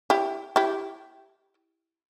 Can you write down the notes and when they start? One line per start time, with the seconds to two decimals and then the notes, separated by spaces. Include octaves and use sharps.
0.10 E4 G4
0.56 E4 G4